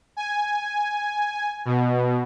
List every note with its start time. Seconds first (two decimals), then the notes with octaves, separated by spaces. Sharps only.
0.17 G#5
1.65 B2